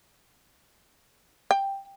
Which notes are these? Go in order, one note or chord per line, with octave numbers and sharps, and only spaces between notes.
G5